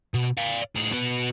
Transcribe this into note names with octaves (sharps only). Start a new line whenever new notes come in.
B2
D5 F5
A2 G#4
B3 F#4